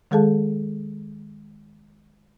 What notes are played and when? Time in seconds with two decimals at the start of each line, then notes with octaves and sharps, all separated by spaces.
0.11 D#3 G#3 G#4 A4 F5 A5